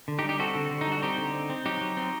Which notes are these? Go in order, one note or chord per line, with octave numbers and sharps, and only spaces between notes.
D3
D#4 G4
G3
D#4 G4
C4 F#4 A4
D3
D3
D#4
G3
F#4
C4 D#4 G4
D3
C4
C4
F#3 D#4 G4
F#3
C4